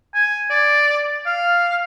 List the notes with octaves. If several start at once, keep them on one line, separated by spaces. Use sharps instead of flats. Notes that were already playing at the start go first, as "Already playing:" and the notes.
G#5
D5
F5